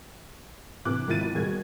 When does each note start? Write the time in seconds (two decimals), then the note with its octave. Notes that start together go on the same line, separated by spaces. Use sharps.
0.85 C3 E3 D6 F#6
1.08 G#1 B2 F3 E4 A6 D#7
1.35 D#2 B2 G3 F#4 G#4 G#6